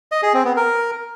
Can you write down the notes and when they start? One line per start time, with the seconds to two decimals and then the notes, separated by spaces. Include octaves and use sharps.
0.12 D#5
0.23 G#4
0.34 C4
0.45 B3
0.56 A#4